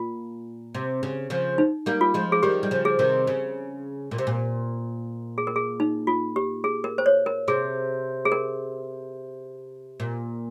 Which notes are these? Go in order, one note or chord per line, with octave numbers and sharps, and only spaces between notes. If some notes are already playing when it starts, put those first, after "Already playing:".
Already playing: A#2 F4
C3
C#3
C#3 F3
D#4
G3 A#3
F4
F3 G#3
G#4
D#3 G3 G4
G3
C#3 F3
G#4
C3 D#3
C#3
A#2
C3
A#2
G#4
A#4
G#4
D#4
F4
G4
G#4
A#4
C5
C#5
A#4
C3 G#4
G#4
A#4
A#2